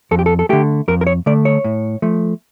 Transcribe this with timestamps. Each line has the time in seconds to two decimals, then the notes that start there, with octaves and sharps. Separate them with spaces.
0.11 F2 A4
0.19 G4
0.26 A4
0.39 A4
0.49 D3 A3 G4
0.88 F2 A#4
1.01 A#4
1.07 C#5
1.26 D3 A3 D5
1.45 C#5
1.64 A2
2.02 F3 A3